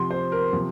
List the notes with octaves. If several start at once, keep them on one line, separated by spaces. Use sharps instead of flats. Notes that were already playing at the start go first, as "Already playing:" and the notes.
Already playing: C3 F3 C6
C5
A#4
C3 F3